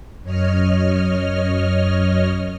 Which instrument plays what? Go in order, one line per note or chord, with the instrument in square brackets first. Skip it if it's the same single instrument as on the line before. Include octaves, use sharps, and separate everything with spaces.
[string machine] F#2 C#5 D#5 F6